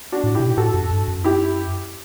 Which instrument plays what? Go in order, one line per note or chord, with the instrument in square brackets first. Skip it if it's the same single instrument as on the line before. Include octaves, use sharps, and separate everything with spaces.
[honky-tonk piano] D4 F#4
[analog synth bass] A2
[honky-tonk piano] E4 G4
[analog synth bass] B2
[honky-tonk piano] G4
[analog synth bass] A2 [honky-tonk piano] F#4 A4
[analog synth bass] F#2
G2
F#2
[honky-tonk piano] E4 G4